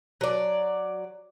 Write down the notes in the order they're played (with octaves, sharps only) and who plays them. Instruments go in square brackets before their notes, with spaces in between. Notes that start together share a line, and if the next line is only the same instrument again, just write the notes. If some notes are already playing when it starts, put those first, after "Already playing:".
[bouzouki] F#3 D5